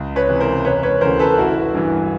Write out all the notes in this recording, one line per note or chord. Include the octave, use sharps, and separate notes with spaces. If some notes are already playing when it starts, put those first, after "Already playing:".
Already playing: C#2
B4 C#5
C3 E3
A#4 C5
E1 B4 C#5
B4 C#5
D2 C#3 E3 A#4 C5
A4 B4
A1 E4 F#4
G2 E3